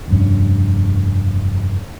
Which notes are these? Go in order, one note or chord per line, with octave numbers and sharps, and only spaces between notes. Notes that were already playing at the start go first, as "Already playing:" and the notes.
F1 G2 B2 C#4